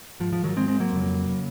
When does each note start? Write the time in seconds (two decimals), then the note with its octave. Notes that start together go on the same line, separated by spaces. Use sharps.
0.20 G#2 F3
0.33 F3
0.44 D#3 F#3
0.56 G#2 G#3 C4
0.68 G#3 C4
0.80 F#3 A#3
0.93 F2 C#3
1.29 C#3